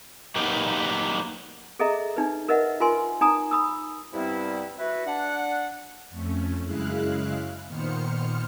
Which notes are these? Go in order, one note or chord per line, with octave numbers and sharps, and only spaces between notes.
F#3 A#3 B3 D#4 G4
G#4 A4 D#5 E5 A#5
D4 D#4 B4
A#4 B4 D#5 E5 F#5
F4 A#4 B4 G#5 C6
D#4 G#5 A#5 D#6
B5 D#6 E6
G2 C3 G3 B3 C4 E4
E4 F#4 B4
D4 F#5
F2 A3 C#4
F#2 C#3 G#3 E4 F5 F#6
A#2 D#3 B3 C5 F6 C#7